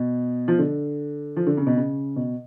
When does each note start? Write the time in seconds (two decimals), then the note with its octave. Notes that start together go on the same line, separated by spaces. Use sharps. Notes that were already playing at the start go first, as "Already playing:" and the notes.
Already playing: B2
0.48 F3
0.59 D3
1.37 F3
1.47 D3
1.57 C#3
1.67 B2
1.77 C#3
2.16 B2